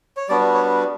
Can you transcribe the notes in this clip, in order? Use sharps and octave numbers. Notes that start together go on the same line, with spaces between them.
C#5
G3 B3 D4 F#4 D5
C#5